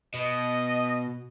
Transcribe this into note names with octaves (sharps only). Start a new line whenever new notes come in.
B2 D#5